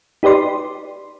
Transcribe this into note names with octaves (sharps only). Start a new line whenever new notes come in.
D#4 G4 B4 D5 C6